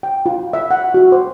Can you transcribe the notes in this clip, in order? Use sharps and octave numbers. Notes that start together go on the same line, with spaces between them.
G5
F4
E5
F#5
F#4
C5